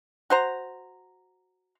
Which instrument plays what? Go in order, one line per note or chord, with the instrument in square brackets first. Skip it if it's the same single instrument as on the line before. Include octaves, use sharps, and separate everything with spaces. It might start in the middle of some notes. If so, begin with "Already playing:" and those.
[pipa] F#4 C5 A#5